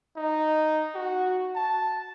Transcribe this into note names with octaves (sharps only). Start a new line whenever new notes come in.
D#4
F#4
A5